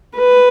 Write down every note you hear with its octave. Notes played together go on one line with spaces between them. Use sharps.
B4